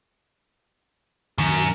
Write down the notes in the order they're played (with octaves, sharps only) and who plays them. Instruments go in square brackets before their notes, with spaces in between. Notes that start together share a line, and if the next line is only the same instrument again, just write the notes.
[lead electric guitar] F#2 [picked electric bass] A#2 D#3 F#3